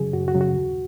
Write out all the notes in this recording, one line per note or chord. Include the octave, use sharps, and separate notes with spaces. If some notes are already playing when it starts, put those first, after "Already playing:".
Already playing: F#2 C#3 F#3 G#4
F#2 F#4
F#4
C#3 F#3
F#4
D#2